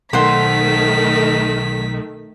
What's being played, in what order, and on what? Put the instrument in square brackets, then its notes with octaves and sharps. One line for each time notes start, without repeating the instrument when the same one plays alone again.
[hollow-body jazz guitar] B1 [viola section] D#3 A3 [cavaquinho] C5 F#5 C6 [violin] B6